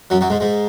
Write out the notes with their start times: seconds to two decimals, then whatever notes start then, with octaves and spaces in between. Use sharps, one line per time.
0.10 F#2 F#3
0.21 F#2 F#3
0.30 G#2 G#3
0.40 G#2 G#3